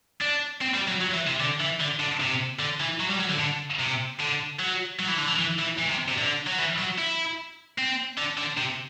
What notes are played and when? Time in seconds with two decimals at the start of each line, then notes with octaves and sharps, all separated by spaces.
0.21 D4
0.61 C4
0.74 G3
0.87 F#3
1.01 F#3
1.14 E3
1.27 C3
1.41 D3
1.61 E3
1.81 D3
2.00 D3
2.20 C3
2.60 D3
2.80 E3
3.00 F#3
3.10 G3
3.20 F#3
3.30 D3
3.40 D3
3.80 C3
4.20 D3
4.59 F#3
4.99 F#3
5.08 E3
5.18 D3
5.27 E3
5.39 E3
5.59 E3
5.79 E3
5.89 C3
6.08 C3
6.18 D3
6.47 F#3
6.59 E3
6.78 F#3
6.98 E4
7.78 C4
8.18 D3
8.38 D3
8.58 C3